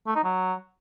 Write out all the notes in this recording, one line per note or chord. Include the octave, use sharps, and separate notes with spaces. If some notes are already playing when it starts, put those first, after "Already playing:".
A3
D#4
F#3